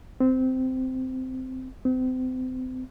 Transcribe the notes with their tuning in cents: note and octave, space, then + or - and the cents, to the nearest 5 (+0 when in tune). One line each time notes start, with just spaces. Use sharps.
C4 -15
C4 -35